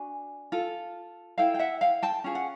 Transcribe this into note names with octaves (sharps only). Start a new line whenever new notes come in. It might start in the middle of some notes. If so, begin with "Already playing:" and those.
Already playing: D4 F#4 G#5
F4 A4
E4 A4 F5 G5
G5
E5 F#5
F5 G5
G5 A5
C#4 F4 G#4
F#5